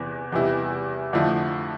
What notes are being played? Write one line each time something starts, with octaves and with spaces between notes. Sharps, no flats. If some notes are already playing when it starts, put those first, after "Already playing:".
Already playing: E2 C3 E3 B3
E2 C3 G3 B3 E4
F2 D3 F3 A3 E4